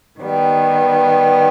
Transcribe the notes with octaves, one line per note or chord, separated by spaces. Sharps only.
D#3 G3 B3